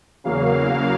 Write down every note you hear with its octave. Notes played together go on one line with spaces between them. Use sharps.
E2 C#3 F#3 A#3 F5